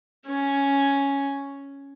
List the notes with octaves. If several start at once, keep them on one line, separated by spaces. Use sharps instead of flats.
C#4